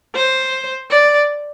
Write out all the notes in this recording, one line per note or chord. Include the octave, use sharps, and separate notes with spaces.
C5
D5